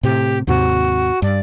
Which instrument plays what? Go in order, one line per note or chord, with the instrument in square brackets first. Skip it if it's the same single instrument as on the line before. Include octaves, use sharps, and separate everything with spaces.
[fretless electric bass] A2 C3 [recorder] G4
[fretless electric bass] D#2 G#2 C3 [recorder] F#4
[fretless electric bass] G2 [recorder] D5